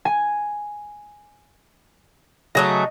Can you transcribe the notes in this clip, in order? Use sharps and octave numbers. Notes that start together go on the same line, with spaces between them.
G#5
C#3 F#3 A3 D#5